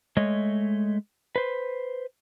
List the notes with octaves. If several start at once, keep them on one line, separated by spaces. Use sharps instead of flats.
G#3 A3 C#5 D#5
B4 C5